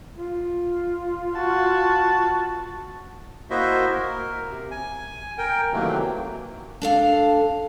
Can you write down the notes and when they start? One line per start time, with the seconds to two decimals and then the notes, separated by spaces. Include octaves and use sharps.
0.17 F4
1.36 F#4 A5
3.50 A#3 E4 F#4 C5 D#5 E5
3.91 A#4
4.50 C3
4.71 G#5
5.38 A#4 G5
5.73 C3 D#3 E3 F#3 A3 A#3
6.82 D4 A4 F5